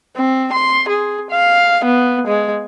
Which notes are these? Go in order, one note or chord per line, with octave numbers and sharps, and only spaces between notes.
C4
C6
G#4
F5
B3
G#3